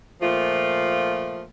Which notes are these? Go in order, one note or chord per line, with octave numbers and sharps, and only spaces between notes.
A#2 F3 A3 F4